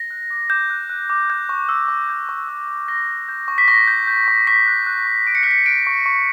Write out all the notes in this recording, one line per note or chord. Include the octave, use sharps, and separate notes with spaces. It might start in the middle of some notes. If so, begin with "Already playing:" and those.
Already playing: A#6
F#6
D6
D6 G6
F#6
F#6
D6
G6
C#6
E6
C#6
G6
C#6
E6
C#6
C#6 A#6
G6
G6
C#6
B6
C#6 A#6
G6
G6
C#6
C#6 B6
F#6
F#6
C#6
C#6 D7
C#7
B6
F#6 C#7
F#6 D7
C#6
C#6